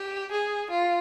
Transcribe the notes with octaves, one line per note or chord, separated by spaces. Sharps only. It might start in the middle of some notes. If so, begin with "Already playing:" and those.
Already playing: G4
G#4
F4